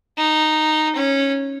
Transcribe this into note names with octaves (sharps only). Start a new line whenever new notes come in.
D#4
C#4